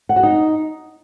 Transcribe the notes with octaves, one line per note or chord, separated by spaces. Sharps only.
F#5
F#4
D#4